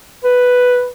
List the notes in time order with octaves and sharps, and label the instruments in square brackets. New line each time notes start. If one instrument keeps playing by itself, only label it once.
[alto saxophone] B4